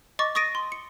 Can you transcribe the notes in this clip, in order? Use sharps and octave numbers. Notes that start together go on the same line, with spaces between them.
D#5 C#6 D6 A6
C#6 D#6 A6 A#6 D7 D#7
C6
C#7